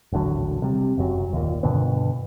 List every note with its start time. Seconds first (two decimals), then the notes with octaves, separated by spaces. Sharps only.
0.12 D#1 A1 D3 F#3
0.62 C3 G3
0.98 F#1 F#2 F#3
1.33 D#2 A#2
1.63 G2 B2 D3 B3